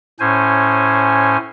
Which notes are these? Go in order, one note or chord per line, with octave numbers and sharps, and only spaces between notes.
A2 C#4 C5 G#5